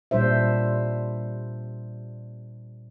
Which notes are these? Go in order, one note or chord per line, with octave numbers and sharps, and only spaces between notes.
A#2 G3 D4 C5 E5